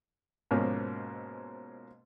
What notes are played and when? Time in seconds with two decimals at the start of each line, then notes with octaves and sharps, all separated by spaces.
0.51 G#2 B2 F3 A#3 C#4